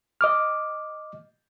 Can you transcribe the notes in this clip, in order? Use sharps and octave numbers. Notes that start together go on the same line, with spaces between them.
D#5 D6 F6